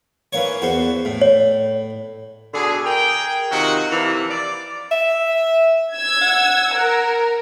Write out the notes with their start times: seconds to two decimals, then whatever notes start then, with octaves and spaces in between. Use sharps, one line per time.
0.33 E3 A#3 C#5
0.62 E2 F#4 C5
1.05 A2
1.21 C#5
2.54 B2 D3 G#4
2.84 G#4 A#4 G5
3.51 C3 D#3 D#4 F4 F#4
3.91 C3 E3 F3 A#3
4.29 D5
4.91 E5
5.93 E6 G#6
6.22 F#5
6.75 A#4